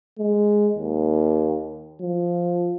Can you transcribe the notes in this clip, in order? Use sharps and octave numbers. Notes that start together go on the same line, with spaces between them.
G#3
D#2
F3